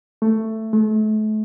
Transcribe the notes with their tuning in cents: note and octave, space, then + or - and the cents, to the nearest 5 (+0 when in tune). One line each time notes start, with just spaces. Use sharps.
A3 +10
A3 -35